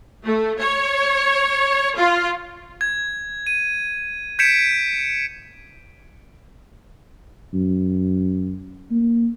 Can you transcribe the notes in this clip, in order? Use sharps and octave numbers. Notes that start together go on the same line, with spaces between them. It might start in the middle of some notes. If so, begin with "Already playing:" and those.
A3
C#5
F4
G#6
D#7
G6 G#6 B6 C#7 D7 E7
F#2
A#3